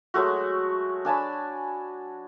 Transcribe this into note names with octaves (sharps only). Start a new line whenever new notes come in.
F#3 G#3 A3 F#4
D4 G#5 A5 B5